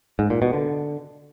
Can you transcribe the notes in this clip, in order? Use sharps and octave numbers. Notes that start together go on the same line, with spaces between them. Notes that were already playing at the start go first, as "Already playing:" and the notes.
G#2
A#2
B2
D3